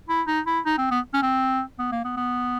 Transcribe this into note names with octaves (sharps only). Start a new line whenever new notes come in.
E4
D#4
E4
D#4
C4
B3
C#4
C4
B3
A#3
B3
B3